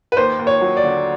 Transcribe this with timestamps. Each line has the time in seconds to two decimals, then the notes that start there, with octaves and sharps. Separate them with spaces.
0.12 B4
0.17 D#2 C5
0.39 D#2
0.47 C#5
0.61 F#3
0.77 D5
0.84 D3